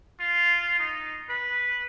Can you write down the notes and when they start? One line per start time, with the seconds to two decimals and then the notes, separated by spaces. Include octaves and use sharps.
0.20 F4
0.80 D#4
1.30 B4